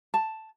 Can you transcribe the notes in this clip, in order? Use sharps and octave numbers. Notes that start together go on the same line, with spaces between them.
A5